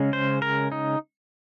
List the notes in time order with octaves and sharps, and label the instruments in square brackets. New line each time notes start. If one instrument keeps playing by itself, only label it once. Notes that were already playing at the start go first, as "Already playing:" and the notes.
Already playing: [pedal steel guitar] C#3 G#3 C#4
C5
A#4
D#4